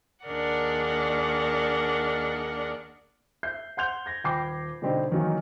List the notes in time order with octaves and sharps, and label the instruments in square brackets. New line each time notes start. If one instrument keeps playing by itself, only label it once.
[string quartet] D#2 D4 G#4 A#4 D5 F#5
[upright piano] E5 G6 C7
F#5 C6 G6 F7
G#6 A#6
D#1 G5 B5 D6 C7
B2 D3 G3 C4 D#4 G4
D#3 E3 F#3 A#3 D#4